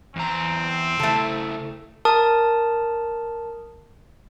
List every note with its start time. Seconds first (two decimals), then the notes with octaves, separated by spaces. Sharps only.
0.16 E2 C4 A#5
0.99 C#3 A3 E4 A4
2.05 A#4 A5 D#6